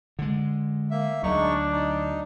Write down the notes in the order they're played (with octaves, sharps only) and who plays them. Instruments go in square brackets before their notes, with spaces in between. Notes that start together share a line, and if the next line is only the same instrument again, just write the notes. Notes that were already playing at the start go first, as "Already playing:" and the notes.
[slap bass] D3 G#3
[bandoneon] A#3 E5
[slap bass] D2 F#3 [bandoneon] G#3 D#4 C#6 [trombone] D4
[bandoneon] D#4